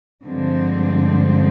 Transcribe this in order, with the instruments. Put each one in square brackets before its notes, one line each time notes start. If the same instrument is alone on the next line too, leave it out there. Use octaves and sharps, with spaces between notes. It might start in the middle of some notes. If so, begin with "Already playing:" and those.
[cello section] G2 D3 F3 G#3 C4